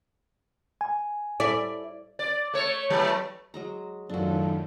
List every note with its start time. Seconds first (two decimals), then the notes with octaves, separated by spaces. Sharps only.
0.81 G#5
1.40 E4 A4 D5 E5
2.19 D5
2.54 A3 C#5
2.90 E3 F#3 A3
3.54 F#3 G#3 A#5
4.09 F#2 A2 D#3 F#3 D4 F4 F#4 A4